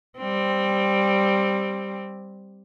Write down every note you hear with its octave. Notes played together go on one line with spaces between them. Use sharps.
G3 C4